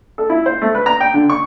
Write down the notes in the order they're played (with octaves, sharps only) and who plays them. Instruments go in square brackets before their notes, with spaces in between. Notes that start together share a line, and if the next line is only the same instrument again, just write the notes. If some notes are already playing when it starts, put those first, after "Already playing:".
[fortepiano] A4
E4
C5
A3
B4
A#5
G5
D3
C#6